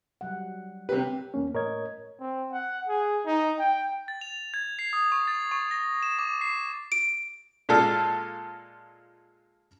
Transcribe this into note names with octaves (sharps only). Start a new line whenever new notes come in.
F#3 G3 F#5
C3 G4 A#4 B4 C#5
E2 A#3 C#4
A2 A#4 C#5 D#5 G#6
C4
F#5
G#4
D#4
G5
A6
F7
G#6
C7
D#6
C#6
A6
C#6
A#6
E7
D6
C7
D7
A#2 G#3 F4 A4